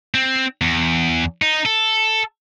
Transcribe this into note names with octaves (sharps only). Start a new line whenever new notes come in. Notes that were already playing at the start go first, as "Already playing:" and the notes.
C4
E2
D#4
A4